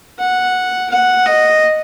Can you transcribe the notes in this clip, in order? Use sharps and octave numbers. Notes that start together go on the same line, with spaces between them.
F#5
F#5
D#5